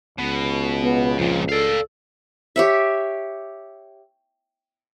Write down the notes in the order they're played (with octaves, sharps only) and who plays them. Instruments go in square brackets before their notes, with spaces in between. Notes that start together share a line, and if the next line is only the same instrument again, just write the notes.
[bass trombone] C#2 [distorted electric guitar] B2
[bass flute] B3
[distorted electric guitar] F2 A#2 [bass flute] F3
[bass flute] A4 [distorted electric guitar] D5 F5
[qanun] G4 C#5 E5